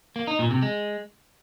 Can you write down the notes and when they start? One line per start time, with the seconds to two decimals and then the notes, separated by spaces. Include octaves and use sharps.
0.16 A#3
0.27 D#4
0.39 A#2
0.51 C3
0.62 G#3